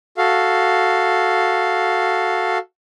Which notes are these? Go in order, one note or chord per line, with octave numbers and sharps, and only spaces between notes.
F#4 A4 F5